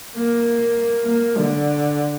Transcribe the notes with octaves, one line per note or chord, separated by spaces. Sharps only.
A#3
A#3
D3